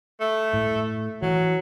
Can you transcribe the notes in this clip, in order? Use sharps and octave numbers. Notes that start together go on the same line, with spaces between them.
A3
A2
E3 F#3